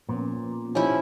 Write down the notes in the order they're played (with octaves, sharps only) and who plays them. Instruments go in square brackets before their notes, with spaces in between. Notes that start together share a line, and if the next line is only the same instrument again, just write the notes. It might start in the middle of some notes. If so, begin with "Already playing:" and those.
[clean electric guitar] A#2 [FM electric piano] F3 B3 C#4
[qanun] F3 E4 [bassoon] C#4 [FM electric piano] D#4 G4